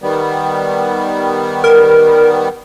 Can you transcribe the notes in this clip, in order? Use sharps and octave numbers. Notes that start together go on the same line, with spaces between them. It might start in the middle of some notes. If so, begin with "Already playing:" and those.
D#3 G3 B3
A#4